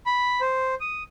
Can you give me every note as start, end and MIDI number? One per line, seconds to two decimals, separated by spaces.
0.06 0.41 83
0.41 0.75 72
0.80 1.03 87